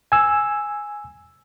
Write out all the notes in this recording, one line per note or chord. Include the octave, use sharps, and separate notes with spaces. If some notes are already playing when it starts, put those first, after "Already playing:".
G#5 E6